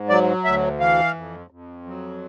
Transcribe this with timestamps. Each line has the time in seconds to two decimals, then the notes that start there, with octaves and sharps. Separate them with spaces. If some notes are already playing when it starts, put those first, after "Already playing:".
Already playing: G#2
0.09 F#3 D5
0.45 D2 E5
0.80 E3 F5
1.15 F2
1.50 F2
1.86 F#3